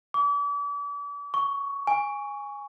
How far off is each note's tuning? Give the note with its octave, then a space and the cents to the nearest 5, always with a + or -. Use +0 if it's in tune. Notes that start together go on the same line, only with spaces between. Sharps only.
D6 -40
C#6 +10
G#5 -10